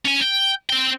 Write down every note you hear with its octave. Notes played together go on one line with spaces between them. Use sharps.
C#4 G#5
G5
C4 G5